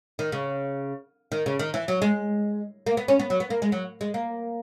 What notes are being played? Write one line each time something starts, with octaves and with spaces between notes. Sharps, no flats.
D#3
C#3
D#3
C#3
D#3
E3
F#3
G#3
A#3
B3
C#4
B3
F#3
B3
A#3
G#3
F#3
G#3
A#3